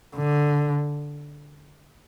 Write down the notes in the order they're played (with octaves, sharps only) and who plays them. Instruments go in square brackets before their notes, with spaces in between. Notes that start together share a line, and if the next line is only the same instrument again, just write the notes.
[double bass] D3